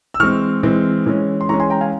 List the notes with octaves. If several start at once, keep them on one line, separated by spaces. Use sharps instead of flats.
E6
E3 G#3 C4 C#6 F6
E3 G#3 C4
E3 G#3 C#4
C6
E3 G#3 C#4 A#5 C#6
G#5 C6
G5 A#5
F5 G#5